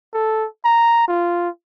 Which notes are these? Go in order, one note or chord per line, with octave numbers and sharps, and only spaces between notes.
A4
A#5
F4